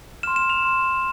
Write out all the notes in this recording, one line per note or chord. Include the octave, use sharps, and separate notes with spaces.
C6 F6 E7
E7
F7
C6 F6